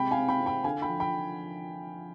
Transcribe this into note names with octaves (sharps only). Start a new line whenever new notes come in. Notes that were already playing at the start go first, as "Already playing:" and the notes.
Already playing: C3 G#3 G5 B5
F5 G#5
C4
G5 B5
C4
G5 B5
D3 F5 G#5
G5 B5
F3
G5 B5